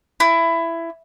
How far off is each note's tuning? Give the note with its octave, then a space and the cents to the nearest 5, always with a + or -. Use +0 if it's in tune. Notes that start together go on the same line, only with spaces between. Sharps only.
E4 +15